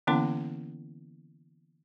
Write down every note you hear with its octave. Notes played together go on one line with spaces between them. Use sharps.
D3 E3 A#3 B3 C#4 E4